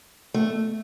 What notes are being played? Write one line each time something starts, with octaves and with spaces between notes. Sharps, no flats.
A3